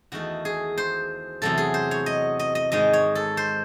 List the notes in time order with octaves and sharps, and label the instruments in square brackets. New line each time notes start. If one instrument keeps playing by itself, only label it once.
[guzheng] E2 D#3 A3 F#4
G#4
C5
E2 C3 F#3 A3 A4
G#4
C5
C#5
D#5
D#5
D#5
G#2 D#3 G#3 D#5
C#5
A4
C5